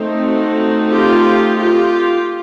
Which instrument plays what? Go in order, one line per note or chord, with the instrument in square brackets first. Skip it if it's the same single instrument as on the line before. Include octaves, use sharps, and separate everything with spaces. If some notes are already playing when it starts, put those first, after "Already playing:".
Already playing: [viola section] A3 C4 D#4
F#4
F4 G4
F4 G4